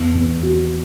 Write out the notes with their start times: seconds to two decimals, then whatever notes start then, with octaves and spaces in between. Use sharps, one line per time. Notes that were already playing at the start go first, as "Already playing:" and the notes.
Already playing: E2
0.15 E2
0.43 F#4